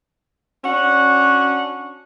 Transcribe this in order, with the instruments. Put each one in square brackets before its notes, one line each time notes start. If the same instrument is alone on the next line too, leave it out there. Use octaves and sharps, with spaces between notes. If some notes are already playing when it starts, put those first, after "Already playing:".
[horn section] C#4 D4 F#4 F#5